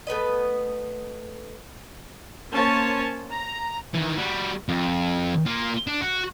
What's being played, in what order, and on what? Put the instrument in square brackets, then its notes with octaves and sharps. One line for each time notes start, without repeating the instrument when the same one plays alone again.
[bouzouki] A3 B3 B4 D#5
[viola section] A#3 C#4 C5 C#5 A5
A#5
[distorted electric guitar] D#3 E3
G3 F#4
F2
A#3 F4
D4
F#4